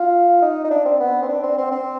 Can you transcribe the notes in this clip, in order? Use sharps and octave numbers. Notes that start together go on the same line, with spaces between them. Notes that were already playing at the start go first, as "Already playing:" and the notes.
Already playing: F4
D#4
D#4
D4
C4
B3
C4
D4
C4
C4
C4